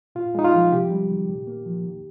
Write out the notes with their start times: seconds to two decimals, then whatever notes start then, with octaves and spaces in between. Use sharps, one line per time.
0.15 A#2 F4
0.35 G#3 D#4
0.44 F4
0.54 F3
0.72 C3 G4
0.90 G3
1.10 D#3
1.28 A#2
1.47 A#3
1.66 F3
1.85 D#3